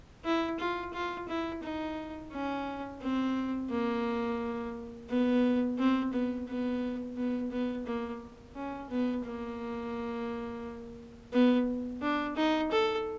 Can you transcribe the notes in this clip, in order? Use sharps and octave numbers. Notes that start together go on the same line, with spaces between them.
E4
F4
F4
E4
D#4
C#4
C4
A#3
B3
C4
B3
B3
B3
B3
A#3
C#4
B3
A#3
B3
D4
D#4
A4